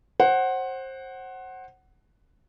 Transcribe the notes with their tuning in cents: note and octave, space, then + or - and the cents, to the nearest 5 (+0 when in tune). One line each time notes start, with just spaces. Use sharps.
C5 +25 F#5 +10